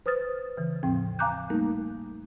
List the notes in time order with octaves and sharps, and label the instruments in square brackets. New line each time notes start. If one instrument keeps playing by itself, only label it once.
[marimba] B4 C5 D#6 F6 A6
C#3 E3
E2 A2 F3 C4 G5
F5 G#5 A#5 D6 F#6 G6
G3 A3 A#3 D#4 A#4